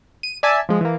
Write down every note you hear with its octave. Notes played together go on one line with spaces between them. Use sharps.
D#7
D5 E5 G#5 A5
F3 G#3
E3 A#3